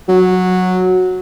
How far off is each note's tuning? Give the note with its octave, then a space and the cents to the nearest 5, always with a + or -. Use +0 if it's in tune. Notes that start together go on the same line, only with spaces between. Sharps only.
F#3 -10